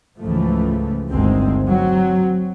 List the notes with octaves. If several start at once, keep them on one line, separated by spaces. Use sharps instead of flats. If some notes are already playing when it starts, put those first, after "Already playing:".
C#2 G#2 E3 F3 A3
G1 D2 D#3 G#3 C4
F#3 C4